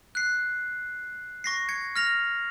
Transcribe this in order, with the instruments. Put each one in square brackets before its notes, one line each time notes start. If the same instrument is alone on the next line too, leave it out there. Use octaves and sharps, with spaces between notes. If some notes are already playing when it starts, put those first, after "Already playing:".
[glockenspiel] F#6 C7
C#6 A#6 C7
G#6 C#7
F6 A#6 F7